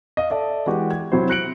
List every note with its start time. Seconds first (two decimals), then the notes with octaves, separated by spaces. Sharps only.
0.17 D#5 F5
0.30 A4 D5 E5 A5
0.66 E3 G#3 F#4 G4
0.91 G#6
1.12 C3 F#3 E4 C5
1.29 F#6 A#6 C#7 D7 F#7